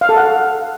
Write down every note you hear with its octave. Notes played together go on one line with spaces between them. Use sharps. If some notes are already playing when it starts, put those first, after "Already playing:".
F5
A4
F#5